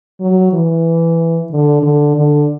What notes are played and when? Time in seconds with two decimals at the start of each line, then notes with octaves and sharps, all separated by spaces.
0.20 F#3
0.53 E3
1.51 D3
1.82 D3
2.16 D3